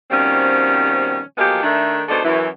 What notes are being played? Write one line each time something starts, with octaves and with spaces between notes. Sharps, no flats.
B2 D#3 F3 G3 C4 C#4
F3 F#3 G#3 A#3 B3 G4
D#3 A3 D4
G#2 B2 D4 D#4 A4 C5
F#2 E3